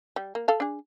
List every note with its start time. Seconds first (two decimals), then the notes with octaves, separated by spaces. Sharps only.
0.16 G3
0.35 A#3
0.48 A4 F5
0.60 D4 G#4